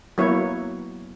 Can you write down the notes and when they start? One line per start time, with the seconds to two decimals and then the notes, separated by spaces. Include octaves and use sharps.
0.18 F#3 A#3 B3 E4 C#5